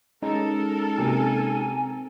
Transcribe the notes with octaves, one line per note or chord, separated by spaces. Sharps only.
G#3 C#4 D#4 A4 A#4
C3 A#3 G#5